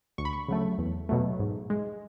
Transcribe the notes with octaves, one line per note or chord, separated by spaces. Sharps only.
D2 C#6
B5
C#6
C#3 F#3 A3
E2
B2 F#3 A3
G#2
G#3